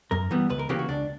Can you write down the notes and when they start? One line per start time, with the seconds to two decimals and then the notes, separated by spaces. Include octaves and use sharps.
0.11 F#2 A#4
0.31 E3 G3 B3
0.50 C#2 B4
0.59 A#4
0.69 C#3 E3 A#3 G4
0.79 F#4
0.88 C#2 D4